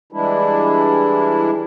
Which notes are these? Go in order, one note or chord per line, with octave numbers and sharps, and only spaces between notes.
E3 G3 G#3 D4 E4